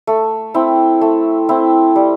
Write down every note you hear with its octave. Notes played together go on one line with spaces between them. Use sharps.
A3
C4 E4
A3
C4 E4
G3